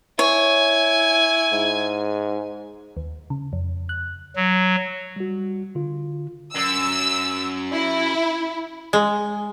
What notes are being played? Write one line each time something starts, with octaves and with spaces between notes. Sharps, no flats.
E4 C#5 G#5
G#2
D#2
C#3
F2
F#6
F#3
G3 F#4
D3 F4
F#2 E6
E4
G#3